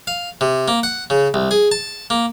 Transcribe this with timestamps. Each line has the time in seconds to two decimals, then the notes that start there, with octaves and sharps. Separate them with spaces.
0.07 F5
0.41 C3
0.68 A#3
0.83 F#5
1.10 C#3
1.34 C2
1.51 G#4
1.71 A5
2.10 A#3